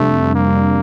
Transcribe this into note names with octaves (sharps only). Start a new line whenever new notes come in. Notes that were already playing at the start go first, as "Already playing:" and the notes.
Already playing: F2 C3 G3 A3 D4
A#3